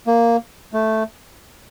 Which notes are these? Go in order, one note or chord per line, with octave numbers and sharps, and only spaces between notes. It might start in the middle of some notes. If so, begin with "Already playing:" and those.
A#3
A3